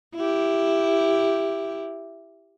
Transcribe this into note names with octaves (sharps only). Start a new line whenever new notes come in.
E4 G4